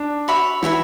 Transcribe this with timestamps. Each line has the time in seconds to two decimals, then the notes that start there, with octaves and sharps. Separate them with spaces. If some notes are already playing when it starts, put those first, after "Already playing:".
Already playing: D4
0.28 F#4 C#5 E5 B5
0.62 E3 E4 F#4 C#5 E5 B5